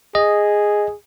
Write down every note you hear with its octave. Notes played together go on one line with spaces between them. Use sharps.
G#4 D#5